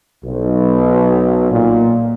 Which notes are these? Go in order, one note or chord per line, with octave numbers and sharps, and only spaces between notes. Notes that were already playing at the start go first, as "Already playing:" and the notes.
B1
A#2